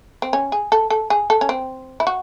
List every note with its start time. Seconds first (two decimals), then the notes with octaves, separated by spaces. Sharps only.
0.22 C4
0.33 C#4
0.52 G#4
0.72 A4
0.90 A4
1.10 G#4
1.30 A4
1.41 C#4
1.49 C4
2.00 E4
2.07 F#4